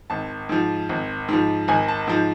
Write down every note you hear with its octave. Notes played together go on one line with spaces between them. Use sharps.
G#1 A5
G#2 F3
G#1
G#2 F3
G#1 G#5
A5
G#2 F3